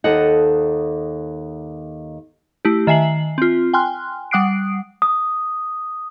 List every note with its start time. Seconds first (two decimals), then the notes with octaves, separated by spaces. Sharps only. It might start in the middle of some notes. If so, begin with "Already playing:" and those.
0.04 D#2 A4 D#5 F#5
2.65 A3 E4 G4
2.87 D#3 E5 G#5 C7 F#7
3.38 C4 F4
3.74 G5 G#5 C6 F6 F#6
4.31 G3 F#5 D#6 F#6 C7 D7
5.02 D#6